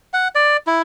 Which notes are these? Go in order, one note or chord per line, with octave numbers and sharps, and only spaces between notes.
F#5
D5
E4